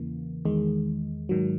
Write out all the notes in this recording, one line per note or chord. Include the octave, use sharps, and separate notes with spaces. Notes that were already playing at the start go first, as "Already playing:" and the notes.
Already playing: E2 C#3 E3 A#3
E2 D#3 G#3
G#2 D#3 F#3